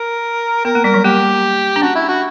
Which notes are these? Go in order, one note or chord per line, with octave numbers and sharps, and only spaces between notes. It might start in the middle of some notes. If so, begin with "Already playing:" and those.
Already playing: A#4
B3 A#4
A#3
G3 A#4
F#3
A#3 G4
D4
C#4 F#4
E4
F#4